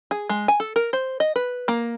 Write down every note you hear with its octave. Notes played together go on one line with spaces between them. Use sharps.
G#4
G#3
G#5
A4
A#4
C5
D#5
B4
A#3